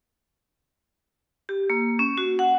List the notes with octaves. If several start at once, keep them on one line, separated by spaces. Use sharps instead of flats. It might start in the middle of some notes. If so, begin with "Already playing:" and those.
G4
A#3
C#4
F#4
F#5